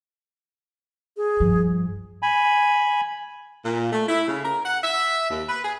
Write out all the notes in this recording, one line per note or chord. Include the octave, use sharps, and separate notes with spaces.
G#4
G2 F3
G#5 B5
A#2
A3
E4
C#3
A#4
F#5
E5
D#2
B4
G#4